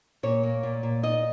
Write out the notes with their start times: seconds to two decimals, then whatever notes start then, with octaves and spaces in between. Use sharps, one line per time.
0.23 A#2 C#5
0.43 A#3
0.63 A#2
0.83 A#2
1.03 D#4 D#5